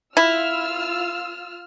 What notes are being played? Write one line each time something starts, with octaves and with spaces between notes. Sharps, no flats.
E4 F4 E6 F6